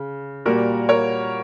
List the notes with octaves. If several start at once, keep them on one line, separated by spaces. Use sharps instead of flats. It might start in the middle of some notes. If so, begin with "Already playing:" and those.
Already playing: C#3
A#2 G3 A#3 F#4 A#4
A#4 C#5